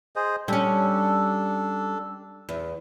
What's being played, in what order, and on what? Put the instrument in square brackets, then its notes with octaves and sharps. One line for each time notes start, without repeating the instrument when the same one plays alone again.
[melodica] G#4 C5 D#5
[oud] G3 C#4 [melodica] D4 A4
[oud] E2